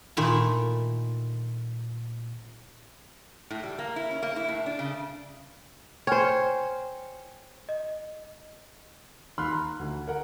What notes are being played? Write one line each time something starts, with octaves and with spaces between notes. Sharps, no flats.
A#2 D#3 A3 E4 F4
A2
G3
A#3
E4
C#4
A#3
E4
A2
D4
C#3
C5 C#5 G5 G#5 F6
D#5
D#2 B5 C6 F6 F#6
A#5
D2
A#4 F#5